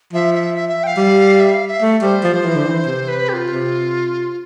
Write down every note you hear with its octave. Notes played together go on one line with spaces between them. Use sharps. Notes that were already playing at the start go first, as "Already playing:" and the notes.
F3 E5
E5
E5
E5
G5
F5
G3
E5
F5
E5
A3
G3 C5
F3
F3
E3
D3
E3
C3
B4
G4
F4
C3